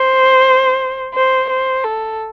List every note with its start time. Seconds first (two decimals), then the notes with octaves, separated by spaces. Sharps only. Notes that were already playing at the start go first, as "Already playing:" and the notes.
Already playing: C5
1.14 C5
1.50 C5
1.84 A4